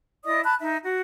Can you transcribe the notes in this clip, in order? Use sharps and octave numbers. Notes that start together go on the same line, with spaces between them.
E4 D5 D#5 D#6
A5 B5 F#6
D#4 E5
F#4